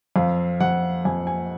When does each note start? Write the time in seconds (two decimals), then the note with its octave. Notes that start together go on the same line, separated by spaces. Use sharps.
0.16 F2 F5
0.60 F2 F#5
1.05 F2 G#5
1.27 G#5